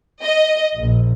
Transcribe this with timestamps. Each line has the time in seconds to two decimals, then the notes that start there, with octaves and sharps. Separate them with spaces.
0.23 D#5
0.77 A#1